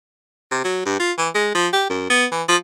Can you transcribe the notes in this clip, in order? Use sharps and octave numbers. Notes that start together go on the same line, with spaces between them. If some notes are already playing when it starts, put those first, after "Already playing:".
C3
F#3
G2
F4
E3
G#3
F3
G4
F#2
B3
E3
F3